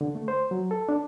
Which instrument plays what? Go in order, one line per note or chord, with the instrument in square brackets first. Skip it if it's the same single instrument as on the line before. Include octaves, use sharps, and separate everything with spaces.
[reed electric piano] D3
A3
C5
F#3
A4
D4